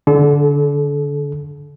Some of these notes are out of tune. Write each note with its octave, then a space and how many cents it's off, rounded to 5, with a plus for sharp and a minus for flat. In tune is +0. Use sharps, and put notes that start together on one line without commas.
D3 -10 A4 -35